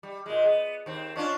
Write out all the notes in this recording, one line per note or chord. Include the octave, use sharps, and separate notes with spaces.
G3
A#2 G#3
B3
D#2 C4
C#4 D4 F4